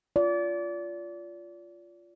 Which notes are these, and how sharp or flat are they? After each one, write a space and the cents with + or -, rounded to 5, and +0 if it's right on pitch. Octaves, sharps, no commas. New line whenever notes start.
F4 -5 D5 -30